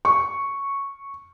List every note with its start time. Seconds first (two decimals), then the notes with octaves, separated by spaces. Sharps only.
0.05 C#6